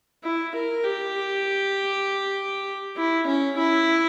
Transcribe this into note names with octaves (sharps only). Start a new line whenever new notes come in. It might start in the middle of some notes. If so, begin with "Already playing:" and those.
E4
A#4
G4
E4
C#4
E4